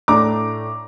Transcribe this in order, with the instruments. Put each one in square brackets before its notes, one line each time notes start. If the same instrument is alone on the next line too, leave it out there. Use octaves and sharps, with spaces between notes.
[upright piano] A2 A3 D4 A#5 D6